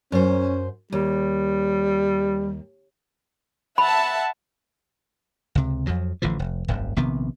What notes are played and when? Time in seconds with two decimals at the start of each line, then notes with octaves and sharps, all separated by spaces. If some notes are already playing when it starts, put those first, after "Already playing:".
0.12 F#2 C#4 C5
0.92 D#2 G3
3.78 E5 F#5 A5 B5
5.55 C#2 C3
5.87 F2 F3 F#3
6.22 A1 D3 E3 F3
6.39 F1
6.68 D#1 G#1 F#2
6.96 A#1 C3 D#3 B3